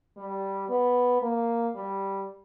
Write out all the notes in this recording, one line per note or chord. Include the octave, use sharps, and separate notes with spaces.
G3
B3
A#3
G3